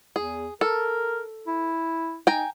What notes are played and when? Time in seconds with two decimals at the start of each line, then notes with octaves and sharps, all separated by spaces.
0.16 E2 G#4
0.61 A4 A#4
1.47 E4
2.27 D#4 G5 G#5 A#5